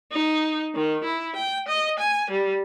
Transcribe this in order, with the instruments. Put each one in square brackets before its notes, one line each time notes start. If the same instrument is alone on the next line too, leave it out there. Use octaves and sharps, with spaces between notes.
[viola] D#4
D#3
E4
G5
D#5
G#5
G3